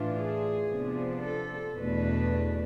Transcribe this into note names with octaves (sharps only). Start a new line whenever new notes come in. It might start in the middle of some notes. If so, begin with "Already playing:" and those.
Already playing: A2 E3 A3 D4 F4
G#4
C3 F3 B3 D4
A4
E2 B2 A3 D4 B4